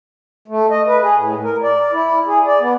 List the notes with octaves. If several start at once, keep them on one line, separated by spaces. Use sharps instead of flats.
A3
D#5
B4
G#4
A2
A#4
D5
E4
G#4
D5
B3